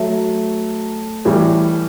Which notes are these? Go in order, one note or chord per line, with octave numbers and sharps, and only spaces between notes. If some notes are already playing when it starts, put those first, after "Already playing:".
Already playing: F#3 A3
A2 E3 G3